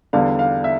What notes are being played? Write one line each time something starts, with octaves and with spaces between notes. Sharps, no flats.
E2 D3 G3 D4 F5
F5
E5